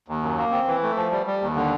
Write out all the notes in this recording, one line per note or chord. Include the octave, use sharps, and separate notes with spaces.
D#2
F#2
A#3
C4
E3
A3
F3
G3
G3
D#2
D3